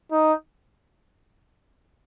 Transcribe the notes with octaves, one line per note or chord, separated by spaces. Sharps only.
D#4